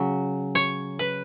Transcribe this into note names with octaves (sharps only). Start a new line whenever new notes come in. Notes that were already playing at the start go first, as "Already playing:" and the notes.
Already playing: C#3 F#3
C#5
B4